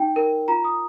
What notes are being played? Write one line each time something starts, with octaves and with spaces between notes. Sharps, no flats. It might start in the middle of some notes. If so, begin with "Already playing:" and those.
Already playing: D#4 G5
A#4
F4 A#5
D#6